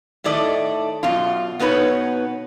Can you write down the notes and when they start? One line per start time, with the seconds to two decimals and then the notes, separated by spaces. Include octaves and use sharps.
0.24 A2 D#3 A3 D5 D#5
1.03 F#2 B2 F4
1.59 B2 B3 D#4 B4 C#5